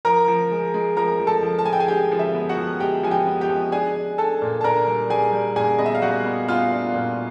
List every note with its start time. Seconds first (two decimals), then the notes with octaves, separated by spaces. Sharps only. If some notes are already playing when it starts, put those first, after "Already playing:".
0.05 F3 A#4 A#5
0.28 F3
0.51 G#3
0.74 G#3
0.97 F3 A#4 A#5
1.20 F3
1.27 A4 A5
1.43 F3
1.59 A5
1.66 G#3 G#5
1.73 G5
1.80 G#4 G#5
1.88 G#3 G4 G5
2.12 F3
2.19 E5
2.35 B3
2.49 F#4 F#5
2.57 F3
2.80 G#3 G4 G5
3.03 F3 G#5
3.11 G4 G5
3.26 B3
3.41 G4 G5
3.49 F3
3.72 D4 G#4 G#5
3.95 D4
4.18 D4 A4 A5
4.42 A#2
4.61 A5
4.64 D4 A#4 A#5
4.87 G3
5.10 G3 G#4 G#5
5.33 G3
5.56 A#2 G#4 G#5
5.79 B3 D#5
5.86 E5
5.95 F5
6.02 G3 F#4 F#5
6.24 B3
6.48 B3 F4 F5
6.71 D4
6.94 A#2